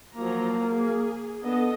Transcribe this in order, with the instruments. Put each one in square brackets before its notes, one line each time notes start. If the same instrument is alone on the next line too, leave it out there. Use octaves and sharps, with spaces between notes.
[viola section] F3 F#3 A#5 [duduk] A#3
[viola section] G#4
[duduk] B3 [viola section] D4 A4 D#5